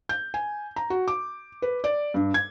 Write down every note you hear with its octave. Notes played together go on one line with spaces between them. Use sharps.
G6
G#5
A#5
F#4
D6
B4
D5
G2
G#6